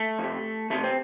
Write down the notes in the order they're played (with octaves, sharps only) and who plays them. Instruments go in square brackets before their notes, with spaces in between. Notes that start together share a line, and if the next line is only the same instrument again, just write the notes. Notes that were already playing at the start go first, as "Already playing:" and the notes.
Already playing: [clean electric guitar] A3
F2 C3
F2 C3 A3
C4